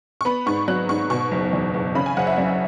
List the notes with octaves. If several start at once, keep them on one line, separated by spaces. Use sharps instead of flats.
C#6
B3 B5
G#2 C#6
F#3 F#6
G#2 C#6
B2 C#6
F#1
E2
F#1
C#3 B5
G#5
F#1 F#5
E5
F#2